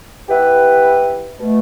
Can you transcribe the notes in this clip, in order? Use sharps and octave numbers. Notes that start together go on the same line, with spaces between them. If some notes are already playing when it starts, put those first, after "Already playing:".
E3 B3 E4 G4 B4
B2 A3